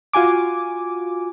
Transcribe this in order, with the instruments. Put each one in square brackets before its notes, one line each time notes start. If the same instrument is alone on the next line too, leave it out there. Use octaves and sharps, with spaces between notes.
[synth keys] F4 F#4 G#5 D6